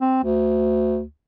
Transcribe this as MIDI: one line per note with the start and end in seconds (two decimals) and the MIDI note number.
0.01 0.23 60
0.24 1.02 38